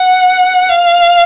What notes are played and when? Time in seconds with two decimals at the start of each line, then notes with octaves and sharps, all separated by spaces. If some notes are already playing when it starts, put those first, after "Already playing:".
Already playing: F#5
0.69 F5